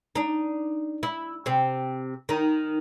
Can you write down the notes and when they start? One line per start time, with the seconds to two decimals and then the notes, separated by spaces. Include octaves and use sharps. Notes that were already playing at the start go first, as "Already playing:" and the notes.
0.15 D4 D#4
1.03 E4
1.46 C3 C4
2.29 D#3 D#4